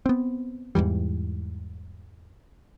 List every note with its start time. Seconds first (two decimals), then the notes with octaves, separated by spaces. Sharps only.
0.06 B3 C4
0.75 E2 G#2 E3 G3